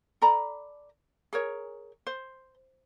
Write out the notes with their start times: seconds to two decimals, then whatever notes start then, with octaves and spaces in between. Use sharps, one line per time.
0.22 A4 D5 A#5 B5
1.33 G#4 A#4 C#5
2.07 C5